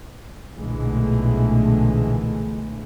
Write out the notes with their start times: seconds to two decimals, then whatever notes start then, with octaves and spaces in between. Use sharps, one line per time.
0.53 B1 A#2 D3 E3 G#3 A3